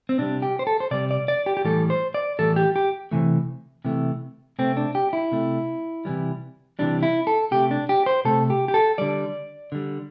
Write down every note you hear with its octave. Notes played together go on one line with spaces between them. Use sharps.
C4
C3 G3 D4
G4
C5
A4
C5
C3 G3 D5
D5
D5
G4
G4
A2 E3 G3 A4
C5
D5
A2 E3 G3 A4
G4
G4
C3 E3 A3
C3 E3 A3
C3 A3 C4
D4
G4
E4
C3 A3
C3 E3 G3
C3 E3 G3 D4
E4
A4
C3 A3 G4
D4
G4
C5
C3 A3 A4
G4
G4
A4
D3 G3 D5
D3 G3